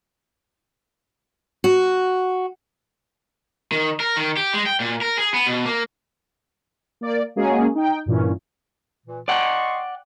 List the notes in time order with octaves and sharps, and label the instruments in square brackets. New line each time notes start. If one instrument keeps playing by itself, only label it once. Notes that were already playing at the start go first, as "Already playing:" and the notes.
[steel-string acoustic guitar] F#4
[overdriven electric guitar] D#3
A#4
D#3
G4
G#3
G5
A#2
A#4
G#4
B3
B2
A#3
[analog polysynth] A#3 D5
G#3 A#3 C#4 F#4 G#4 A#4
D#4 G5
G2 A#2 E3 C#4
[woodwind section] A#2 E3
[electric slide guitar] D5 F#5 G5 [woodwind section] D#5 C6 C#6